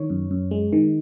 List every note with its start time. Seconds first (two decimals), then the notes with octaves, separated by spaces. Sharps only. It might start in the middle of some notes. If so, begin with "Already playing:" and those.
Already playing: D#3 C#5
0.10 F#2
0.31 F#2
0.51 G#3
0.73 D#3